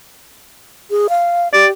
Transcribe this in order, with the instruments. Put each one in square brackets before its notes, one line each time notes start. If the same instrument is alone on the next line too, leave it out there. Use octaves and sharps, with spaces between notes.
[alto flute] G#4
F5
[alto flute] G4 [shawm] D5